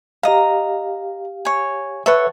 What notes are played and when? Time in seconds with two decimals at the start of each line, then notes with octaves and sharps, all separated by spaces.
0.23 G4 D#5 F5 A#5
1.45 C#5 G#5
2.06 A4 B4 C#5 E5 F#5